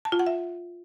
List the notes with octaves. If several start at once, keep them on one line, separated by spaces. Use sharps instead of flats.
A5
F4
F#5
E5